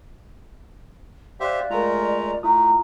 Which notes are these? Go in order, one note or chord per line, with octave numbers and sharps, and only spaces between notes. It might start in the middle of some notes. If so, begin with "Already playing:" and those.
G4 C5 D5 E5 F5 F#6
G#3 A3 F4 A#4 A#5
A3 E4 F4 A#5 D#6